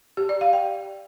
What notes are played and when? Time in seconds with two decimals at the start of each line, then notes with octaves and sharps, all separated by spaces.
0.17 G4
0.29 D5
0.41 F5
0.53 G5